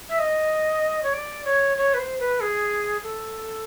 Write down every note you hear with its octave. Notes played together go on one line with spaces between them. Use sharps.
E5
D#5
C#5
D5
C#5
C#5
B4
C5
B4
G#4
A4